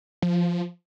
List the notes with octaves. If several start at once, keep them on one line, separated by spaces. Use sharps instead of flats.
F3